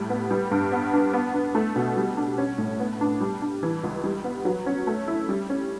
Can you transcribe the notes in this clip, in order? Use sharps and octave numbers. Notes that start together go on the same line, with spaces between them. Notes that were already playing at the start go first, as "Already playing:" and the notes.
Already playing: A2 G3
B3
G3
G2
B3
D4
B3
D4
A3
B2
G3
D4
C#4
A2
B3
D4
G3
D4
E3
C#2
G3
B3
F#3
C#4
A3
E4
G3
C#4